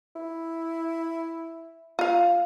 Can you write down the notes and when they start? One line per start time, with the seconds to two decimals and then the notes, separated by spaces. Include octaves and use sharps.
0.16 E4
1.99 F4 F5